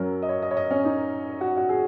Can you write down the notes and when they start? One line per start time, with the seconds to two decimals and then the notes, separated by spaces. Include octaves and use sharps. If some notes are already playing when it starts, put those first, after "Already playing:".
Already playing: F#2 F#3 C#4 A#4
0.23 D#5
0.29 C#5
0.42 D#5
0.51 C#5
0.57 D#5
0.71 C#4
0.85 D#4
1.41 F#4
1.57 F#4
1.69 G#4